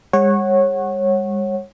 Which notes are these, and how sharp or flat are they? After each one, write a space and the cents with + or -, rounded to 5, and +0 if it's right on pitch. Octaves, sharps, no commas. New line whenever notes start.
G#3 -45 C#5 -20 F#5 +5